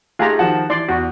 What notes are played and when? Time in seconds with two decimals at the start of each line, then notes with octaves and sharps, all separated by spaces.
0.19 A3 D#4 F4 G4 G#4 A#5
0.39 D#3 F3 F#5 A5
0.70 E3 D5 C6
0.89 E2 F#4